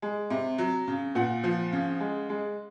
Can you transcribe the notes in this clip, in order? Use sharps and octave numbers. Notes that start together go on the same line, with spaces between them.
G#3
C3
F#3
C#3
A#2 F#5
F3
C#3
G#3
G#3